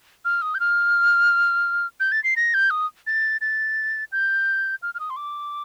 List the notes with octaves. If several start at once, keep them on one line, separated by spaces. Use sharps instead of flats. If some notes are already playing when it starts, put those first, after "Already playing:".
F6
D#6
G6
F6
G6
A6
C7
A#6
G6
D#6
A6
A6
G6
F6
F6
D#6
C6
D6